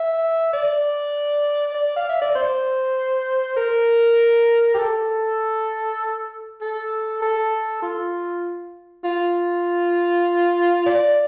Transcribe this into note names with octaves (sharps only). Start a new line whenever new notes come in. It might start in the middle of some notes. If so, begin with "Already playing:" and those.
Already playing: E5
D5
D5
F5
E5
D5
C5
A#4
G4
A4
A4
A4
F4
F4
D5